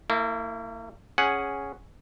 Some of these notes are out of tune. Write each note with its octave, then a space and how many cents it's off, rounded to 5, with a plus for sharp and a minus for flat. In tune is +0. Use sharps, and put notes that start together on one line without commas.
A#3 -40 E4 +0
C#4 +0 G#4 +0 F#5 +0